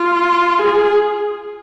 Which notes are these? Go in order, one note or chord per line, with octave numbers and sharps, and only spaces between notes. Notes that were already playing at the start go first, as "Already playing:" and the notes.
Already playing: F4
G#4